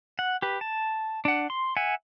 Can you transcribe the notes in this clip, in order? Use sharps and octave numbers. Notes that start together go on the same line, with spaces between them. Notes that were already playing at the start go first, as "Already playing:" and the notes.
F#5
G4 B4
A5
D4 F#5
C6
E5 F#5 G#5